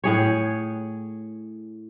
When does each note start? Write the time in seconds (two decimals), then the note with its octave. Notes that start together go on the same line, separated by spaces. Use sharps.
0.04 A2 G#4 C#5